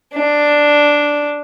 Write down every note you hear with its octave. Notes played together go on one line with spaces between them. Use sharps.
D4